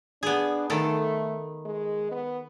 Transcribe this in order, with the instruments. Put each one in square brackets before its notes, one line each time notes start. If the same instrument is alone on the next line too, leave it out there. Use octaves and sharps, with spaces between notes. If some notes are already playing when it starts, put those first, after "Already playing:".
[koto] B3 G#4 [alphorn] D4
[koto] D#3 A4 [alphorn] A3
[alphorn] G#3
B3